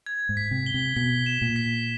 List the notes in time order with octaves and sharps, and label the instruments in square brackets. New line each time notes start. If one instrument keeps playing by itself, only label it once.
[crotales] G#6
[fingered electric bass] G#2
[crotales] B6
[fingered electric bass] C3
[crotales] G7
[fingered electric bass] C3
[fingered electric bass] B2 [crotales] B6
[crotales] E7
[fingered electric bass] A#2
[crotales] B6